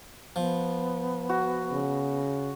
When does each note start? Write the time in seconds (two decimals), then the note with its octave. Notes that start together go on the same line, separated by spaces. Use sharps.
0.36 F3 B3
1.29 F#4
1.72 C#3